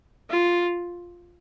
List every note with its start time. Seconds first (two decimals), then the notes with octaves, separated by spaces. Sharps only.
0.30 F4